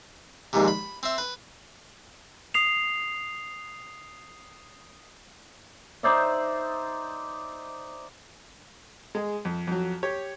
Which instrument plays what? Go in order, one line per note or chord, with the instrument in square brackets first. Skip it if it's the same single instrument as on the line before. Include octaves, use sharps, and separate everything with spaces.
[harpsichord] A#1 D#2 G#2 C3
B5
C4 E5
B4
[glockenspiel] D#6 C7 F7
[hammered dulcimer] D#4 C5 D5 E5
[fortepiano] G#3 G#4
F2
F2 F#3
G4 C#5